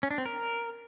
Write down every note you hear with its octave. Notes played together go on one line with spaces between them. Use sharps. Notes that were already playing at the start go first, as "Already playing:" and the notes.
C#4
D4
C4
A#4